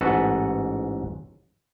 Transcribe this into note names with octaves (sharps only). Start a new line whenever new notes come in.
A1 G#2 F#4 A4 B4 F#5